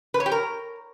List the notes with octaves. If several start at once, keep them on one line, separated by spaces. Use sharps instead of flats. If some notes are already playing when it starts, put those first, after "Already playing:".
B4
C#5
G4
A#4